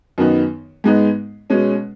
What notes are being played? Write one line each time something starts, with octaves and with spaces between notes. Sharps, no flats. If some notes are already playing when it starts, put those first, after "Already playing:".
F#2 D#3 B3 D#4
G#2 G#3 B3 D#4
B2 G#3 C#4